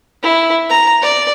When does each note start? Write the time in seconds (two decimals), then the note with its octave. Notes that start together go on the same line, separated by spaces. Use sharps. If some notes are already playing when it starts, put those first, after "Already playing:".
0.22 E4
0.70 A#5
1.02 D5